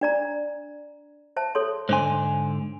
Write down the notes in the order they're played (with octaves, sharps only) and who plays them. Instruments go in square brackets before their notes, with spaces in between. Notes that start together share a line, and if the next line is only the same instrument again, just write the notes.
[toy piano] D4 D5 A#5
C5 E5 A5
A4 C#5 C6
[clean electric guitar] G#2 D3 G#5 [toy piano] C5 C6